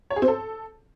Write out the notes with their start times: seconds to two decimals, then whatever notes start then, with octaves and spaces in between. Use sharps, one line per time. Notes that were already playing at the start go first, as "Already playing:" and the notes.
0.10 C#5
0.16 G#4
0.22 C4
0.28 A4